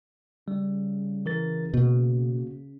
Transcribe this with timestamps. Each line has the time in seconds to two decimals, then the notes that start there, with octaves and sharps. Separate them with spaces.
0.48 C#3 G3
1.26 E3 A#4 A6
1.74 B2 A#3 F#4